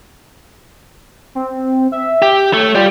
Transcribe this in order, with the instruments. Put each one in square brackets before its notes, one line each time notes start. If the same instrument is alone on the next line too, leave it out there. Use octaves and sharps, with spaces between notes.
[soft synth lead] C4
E5
[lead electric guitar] G4
[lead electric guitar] A3 [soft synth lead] C#5
[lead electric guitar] G3 G4 [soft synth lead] F4